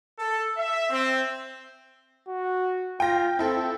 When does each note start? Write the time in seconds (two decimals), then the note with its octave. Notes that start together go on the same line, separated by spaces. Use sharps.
0.19 A4
0.57 E5
0.90 C4
2.28 F#4
3.00 F4 G5 A#6
3.39 C4 E4 A4